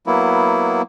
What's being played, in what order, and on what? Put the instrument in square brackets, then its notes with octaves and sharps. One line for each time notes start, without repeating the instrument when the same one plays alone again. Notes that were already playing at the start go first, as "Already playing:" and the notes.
[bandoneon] F#3 A#3 B3 E4